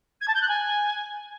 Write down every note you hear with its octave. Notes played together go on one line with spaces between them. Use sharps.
G#6
A5
G6
F#6
G#5